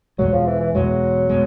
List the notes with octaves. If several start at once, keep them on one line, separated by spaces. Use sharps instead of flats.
E2 B2 F#3 G#3
F3
E3
E3
E2 B2 F#3 G#3
B2 G#3